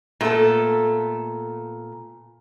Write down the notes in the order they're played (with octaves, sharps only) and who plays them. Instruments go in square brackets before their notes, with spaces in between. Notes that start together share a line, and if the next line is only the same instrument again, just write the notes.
[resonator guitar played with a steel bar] A#2 A3 B3 D4 A4